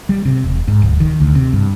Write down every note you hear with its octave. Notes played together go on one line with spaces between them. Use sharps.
G3
C3
E1
G#2
D1
D#3
D2
C3
G2